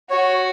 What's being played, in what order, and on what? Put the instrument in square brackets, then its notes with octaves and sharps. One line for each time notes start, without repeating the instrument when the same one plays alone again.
[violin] F#4 [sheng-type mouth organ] C#5